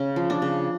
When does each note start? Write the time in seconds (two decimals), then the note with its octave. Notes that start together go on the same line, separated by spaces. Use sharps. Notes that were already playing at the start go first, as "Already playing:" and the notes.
Already playing: C#3 C#4
0.16 F3
0.30 D4
0.42 C#3